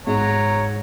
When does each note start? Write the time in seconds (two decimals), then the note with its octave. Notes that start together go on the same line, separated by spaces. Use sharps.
0.07 G#2 C#5 A#5